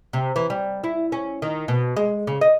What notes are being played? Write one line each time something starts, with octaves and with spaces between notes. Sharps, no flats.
C3
E3
G3
E4
C#4
D#3
B2
G#3
C#3
D#5